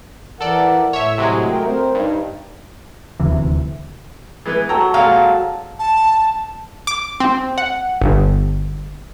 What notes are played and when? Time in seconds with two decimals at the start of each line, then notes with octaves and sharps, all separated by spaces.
0.41 E3 A4 A#4 D5 F#5
0.93 A2 C#5 E5
1.18 C3 F#3 G#3
1.51 A3 A#4 G5
1.67 C4 A#4 C5
1.95 G2 D#4
3.20 D#1 D2 C3 E3
4.46 E3 G#3 B3
4.69 F#3 A4 G5 A#5
4.94 A#2 G#3 F5
5.79 A5
6.87 D6
7.20 C4
7.58 F#5
8.02 G1